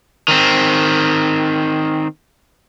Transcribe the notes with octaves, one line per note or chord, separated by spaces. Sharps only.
D#3 C4